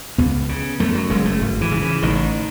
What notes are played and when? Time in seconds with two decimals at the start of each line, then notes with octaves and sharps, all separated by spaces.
0.18 C#2 B3
0.49 C#3
0.79 F#2 A3
0.95 F#3
1.10 F#1 G#3
1.26 A3
1.41 G#1
1.61 E3
1.72 C#3
1.82 E3
2.02 A1 D#3